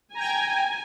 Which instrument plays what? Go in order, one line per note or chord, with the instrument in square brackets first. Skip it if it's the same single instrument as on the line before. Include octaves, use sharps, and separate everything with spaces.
[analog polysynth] G5 A#5 [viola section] G#5